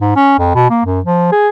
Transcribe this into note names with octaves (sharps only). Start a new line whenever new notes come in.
G#2
C#4
F2
B2
A#3
F#2
F3
G#4